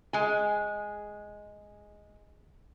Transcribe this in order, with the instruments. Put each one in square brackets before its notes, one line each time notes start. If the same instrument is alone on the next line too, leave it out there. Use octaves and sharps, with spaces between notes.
[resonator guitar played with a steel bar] G#3 G#5